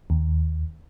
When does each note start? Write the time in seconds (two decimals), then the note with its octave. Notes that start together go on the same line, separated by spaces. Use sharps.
0.10 D#2